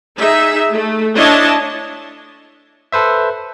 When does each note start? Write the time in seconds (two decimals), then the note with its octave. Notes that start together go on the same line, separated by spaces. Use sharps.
0.17 D#4 G#4 E5
0.72 A3
1.15 D4 E4 C#5 D#5 A5
2.92 A4 B4 C5 E5